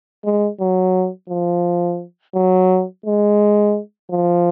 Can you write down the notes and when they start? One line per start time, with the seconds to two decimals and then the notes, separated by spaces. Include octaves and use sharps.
0.25 G#3
0.60 F#3
1.29 F3
2.35 F#3
3.06 G#3
4.10 F3